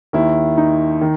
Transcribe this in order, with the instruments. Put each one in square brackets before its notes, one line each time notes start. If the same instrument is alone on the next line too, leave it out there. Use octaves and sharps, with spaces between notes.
[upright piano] D#2 D#3 E4
D#4
D#3